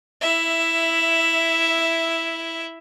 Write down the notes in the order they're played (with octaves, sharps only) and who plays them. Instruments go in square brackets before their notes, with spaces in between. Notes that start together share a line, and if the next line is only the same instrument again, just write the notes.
[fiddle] E4 E5